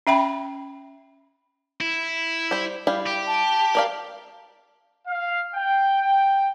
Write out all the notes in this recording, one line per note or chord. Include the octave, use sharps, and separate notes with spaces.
C#4 E5 G5 B5
E4
G3 C5
G3 E4 F5
G4
A5
A#4 D5 F5
F5
G5
G5